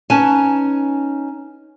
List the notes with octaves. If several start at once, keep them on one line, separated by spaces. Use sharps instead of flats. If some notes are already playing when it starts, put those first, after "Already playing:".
C#4 D#4 B4 G#5 A5